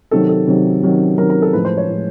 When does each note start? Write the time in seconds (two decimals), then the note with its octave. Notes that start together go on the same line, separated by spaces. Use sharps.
0.11 C3 D#3 F#3 A4
0.29 A4
0.47 C3 D#3 F#3
0.82 C3 D#3 F#3
1.18 C3 D#3 F#3 A#4
1.30 A#4
1.42 A4
1.53 A2 F3 G#3 B4
1.65 C5
1.77 C#5
1.89 A2 F3 G#3